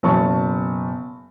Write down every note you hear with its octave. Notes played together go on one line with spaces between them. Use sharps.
F#1 B2 A5 C#6